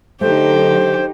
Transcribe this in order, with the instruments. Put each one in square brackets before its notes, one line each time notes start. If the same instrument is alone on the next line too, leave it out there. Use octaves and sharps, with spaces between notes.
[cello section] D3 F#3 D#4 [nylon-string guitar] A3 [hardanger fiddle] G4 [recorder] C5